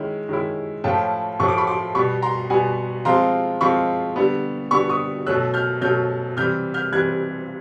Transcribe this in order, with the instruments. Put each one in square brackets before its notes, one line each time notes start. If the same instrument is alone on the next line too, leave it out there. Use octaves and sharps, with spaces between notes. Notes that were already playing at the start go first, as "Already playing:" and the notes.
Already playing: [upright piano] D#3 G#3 C#4 E4
D#3 G#3 C#4 E4
A2 F3 A3 C#4 F4 G5 A5
A2 F3 A3 C#4 F4 C#6
D6
B5 C#6
C6 D6
B2 G3 B3 B5 C#6
A#5 C6
B2 G3 B3 F#5 G#5
F3 G#3 C4 F4 A#5 C6
F3 G#3 C4 F4 B5 C#6
D3 G3 B3
D3 G3 B3 B5 C#6
C#6 D#6
B2 F#3 A3 C#4 E6 F#6
F6 G6
B2 F#3 A3 C#4 F6 G6
C3 E3 G3 F6 G6
F6 G6
C3 E3 G3 F#6 G#6